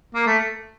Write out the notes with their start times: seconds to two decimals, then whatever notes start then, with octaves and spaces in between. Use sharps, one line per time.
0.15 A#3
0.27 A3